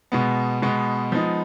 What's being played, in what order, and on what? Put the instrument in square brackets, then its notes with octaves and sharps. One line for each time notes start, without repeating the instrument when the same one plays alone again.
[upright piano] B2 G#3 B3
B2 G#3 B3
F3 G#3 B3 D#4